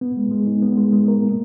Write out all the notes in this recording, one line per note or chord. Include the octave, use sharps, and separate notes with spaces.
B3
G#3
G#3
D#4
B3
G#3
G#3
A#4
A#3